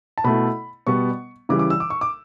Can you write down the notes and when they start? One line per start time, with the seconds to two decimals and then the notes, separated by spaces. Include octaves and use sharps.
0.18 A5
0.24 B2 A3 E4 B5
0.87 B2 G3 B3 C#6
1.49 C#3 E3 G3 D6
1.59 D6
1.70 E6
1.80 D6
1.90 C#6
2.01 D6